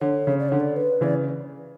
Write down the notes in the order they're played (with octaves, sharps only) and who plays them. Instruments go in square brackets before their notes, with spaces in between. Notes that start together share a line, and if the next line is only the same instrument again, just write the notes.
[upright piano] D3 [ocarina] C#5
[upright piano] C#3
[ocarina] D5
[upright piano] D3 [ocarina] C#5
[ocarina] D5
B4
[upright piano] C#3 E3 [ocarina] D5